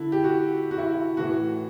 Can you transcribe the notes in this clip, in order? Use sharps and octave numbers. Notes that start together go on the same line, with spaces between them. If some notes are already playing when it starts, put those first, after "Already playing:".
Already playing: D3 E4
G4
F#4
F#4
E4
E4
A2 E3 A3 F#4